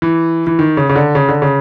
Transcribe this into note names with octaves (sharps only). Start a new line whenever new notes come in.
E3
E3
D#3
C#3
C#3
D3
C#3
D3
C#3